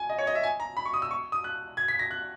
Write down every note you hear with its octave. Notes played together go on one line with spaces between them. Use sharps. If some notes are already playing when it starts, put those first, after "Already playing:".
Already playing: G#5
D#5
C#5
D#5
E5
G#5
A#5
B5
C#6
D#6
E6
C#6
D#6
F#6
G#6
B6
A#6
F#6